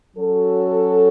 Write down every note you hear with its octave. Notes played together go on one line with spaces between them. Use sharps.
F#3 C#4 F#4 A4 C#5